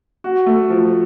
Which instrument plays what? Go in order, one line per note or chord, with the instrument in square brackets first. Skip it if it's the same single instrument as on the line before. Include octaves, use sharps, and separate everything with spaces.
[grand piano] F#4
A3
F3